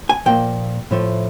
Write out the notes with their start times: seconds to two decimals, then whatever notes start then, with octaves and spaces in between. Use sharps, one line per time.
0.09 G#5
0.26 A#2 F3 A#3 G5
0.91 A2 F3 A3